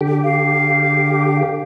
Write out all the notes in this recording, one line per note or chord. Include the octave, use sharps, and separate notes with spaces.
D3 G4
F5